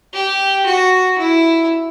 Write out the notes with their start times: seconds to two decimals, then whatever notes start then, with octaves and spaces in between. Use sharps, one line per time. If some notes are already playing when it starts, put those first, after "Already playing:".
0.14 G4
0.66 F#4
1.18 E4